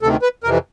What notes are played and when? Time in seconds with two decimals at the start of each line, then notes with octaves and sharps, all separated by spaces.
0.02 D2 C3 D#3 A4
0.22 B4
0.44 F2 C3 E3 A#4